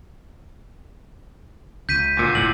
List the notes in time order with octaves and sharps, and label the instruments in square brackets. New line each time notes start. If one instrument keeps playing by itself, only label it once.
[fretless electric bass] C#2 [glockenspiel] G6 B6 D#7
[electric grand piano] D2 A#2
[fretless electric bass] E1 A2 [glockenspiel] F#7